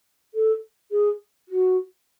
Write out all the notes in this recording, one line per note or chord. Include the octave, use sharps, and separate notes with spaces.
A4
G#4
F#4